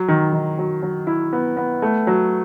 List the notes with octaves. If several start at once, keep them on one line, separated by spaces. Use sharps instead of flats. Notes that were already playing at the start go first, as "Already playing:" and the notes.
Already playing: F#3
D#3
D#3
F#3
F#3
E4
B3
B3
A3
F#3